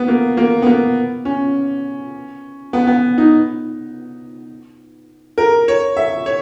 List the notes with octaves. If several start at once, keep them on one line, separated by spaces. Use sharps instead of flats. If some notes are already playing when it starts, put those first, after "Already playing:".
Already playing: B3
A#3
A#3
B3
A#3
C#4
B3
B3
D#4
A#4
C#5
E5
C#5